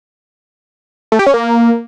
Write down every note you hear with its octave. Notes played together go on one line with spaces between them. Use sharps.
A3
G4
C#4
A#3